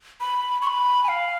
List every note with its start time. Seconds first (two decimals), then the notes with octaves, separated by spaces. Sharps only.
0.21 B5
0.62 C#6
0.67 B5
1.04 G#5
1.08 F5